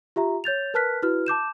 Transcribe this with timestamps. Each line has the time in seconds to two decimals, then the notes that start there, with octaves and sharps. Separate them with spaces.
0.16 F4 G4 E5 A#5
0.44 C#5 G6 A6 F7
0.74 A#4 B4 A5 F6 F#6 B6
1.02 E4 F#4 B4 F6
1.27 A5 D6 G6 E7